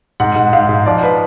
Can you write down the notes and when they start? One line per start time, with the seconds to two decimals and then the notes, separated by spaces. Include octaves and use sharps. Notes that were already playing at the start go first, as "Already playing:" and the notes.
0.20 G#2 F#5
0.36 G#2
0.53 G#2 F5
0.69 G#2
0.86 F3 D5
1.03 B4